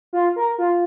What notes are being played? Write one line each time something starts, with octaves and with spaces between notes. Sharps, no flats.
F4
A#4
F4